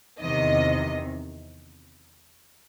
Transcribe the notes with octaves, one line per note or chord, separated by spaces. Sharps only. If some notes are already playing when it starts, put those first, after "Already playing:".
E2 C3 D#3 D#5